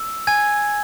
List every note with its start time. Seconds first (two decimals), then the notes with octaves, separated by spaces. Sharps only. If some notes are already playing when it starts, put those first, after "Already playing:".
Already playing: E6
0.27 G#5 G#6